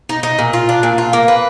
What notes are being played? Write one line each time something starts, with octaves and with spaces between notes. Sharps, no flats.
D#4
D#4
A#2
F4
D4
A#2
F4
A#3
B4